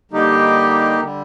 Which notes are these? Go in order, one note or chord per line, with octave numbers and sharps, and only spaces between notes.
D3 G3 A#3 D#4 G4
D3 G3